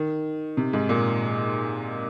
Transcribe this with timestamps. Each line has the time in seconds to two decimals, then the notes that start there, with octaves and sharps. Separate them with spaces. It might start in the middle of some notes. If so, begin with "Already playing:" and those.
Already playing: D#3
0.57 C3
0.73 G#2
0.89 A#2